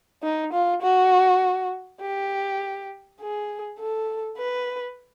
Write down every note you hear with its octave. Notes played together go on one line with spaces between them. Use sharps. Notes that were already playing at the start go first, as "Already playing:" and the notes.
D#4
F4
F#4
G4
G#4
A4
B4